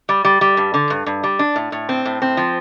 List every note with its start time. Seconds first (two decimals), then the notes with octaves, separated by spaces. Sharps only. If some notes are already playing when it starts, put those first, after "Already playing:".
0.09 G3
0.25 G3
0.41 G3
0.57 G2
0.74 D3
0.90 G2
1.06 G2
1.24 G3
1.39 D4
1.56 A2
1.72 A2
1.89 C4
2.05 A2
2.22 C4
2.37 F3